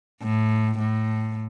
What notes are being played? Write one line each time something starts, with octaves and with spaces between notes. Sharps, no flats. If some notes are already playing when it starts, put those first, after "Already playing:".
A2
A2